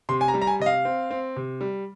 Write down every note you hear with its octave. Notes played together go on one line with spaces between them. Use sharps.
C3 C6
G#5
A#5
G3
A#5
G#5
C3 D#5
F5
C4
C4
C3
G3